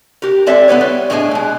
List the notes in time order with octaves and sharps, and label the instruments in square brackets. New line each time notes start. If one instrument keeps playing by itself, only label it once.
[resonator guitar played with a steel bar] G4 A#4
G#3 C4 A4 D5 E5
B3 E4 B4 C#5
G3
A2 A3 D4 G#4 D#5 G#5
B2 G#3